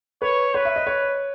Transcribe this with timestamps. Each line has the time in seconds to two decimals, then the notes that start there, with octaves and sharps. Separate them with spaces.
0.22 B4 C#5
0.54 B4 C#5
0.65 E5
0.76 D#5
0.87 C#5